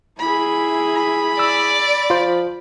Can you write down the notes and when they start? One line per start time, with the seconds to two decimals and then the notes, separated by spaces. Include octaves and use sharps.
0.19 E4 G#4 B5
1.39 D5 E6
2.10 F4 C5